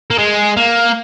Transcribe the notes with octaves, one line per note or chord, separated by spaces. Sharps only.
A#3
G#3
A#3